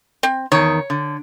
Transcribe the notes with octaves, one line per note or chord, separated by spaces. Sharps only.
C4
E2 D#3 C#5
D3